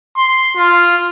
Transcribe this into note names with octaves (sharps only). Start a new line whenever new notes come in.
C6
F4